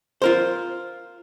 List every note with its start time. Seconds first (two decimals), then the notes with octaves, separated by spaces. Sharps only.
0.22 F4 A#4 C5